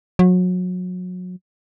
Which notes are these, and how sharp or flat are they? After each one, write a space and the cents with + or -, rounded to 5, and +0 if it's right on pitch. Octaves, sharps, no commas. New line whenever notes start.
F#3 -30